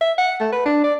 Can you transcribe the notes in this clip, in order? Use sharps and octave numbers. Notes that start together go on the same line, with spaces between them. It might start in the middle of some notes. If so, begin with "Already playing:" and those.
E5
F#5
A3
B4
D4
D5